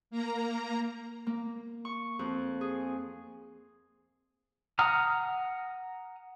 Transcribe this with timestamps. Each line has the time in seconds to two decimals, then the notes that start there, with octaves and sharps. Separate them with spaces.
0.11 A#3 A#5
1.27 A#3
1.85 C#6
2.19 F2
2.61 G#4
4.79 F#5 A#5 D#6 F6